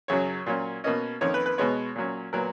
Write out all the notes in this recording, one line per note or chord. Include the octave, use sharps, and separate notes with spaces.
F#2 C#3 F#3 C#5
A#2 F#3 C#4
B2 A#3 C#4 D#5
F2 D#3 A#3 C#4 C#5
B4
B4
B2 G#3 B3 C#5
A#2 F#3 C#4
A#2 F#3 B3 A#4